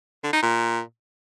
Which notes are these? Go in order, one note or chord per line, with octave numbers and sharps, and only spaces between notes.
D3
D#4
A#2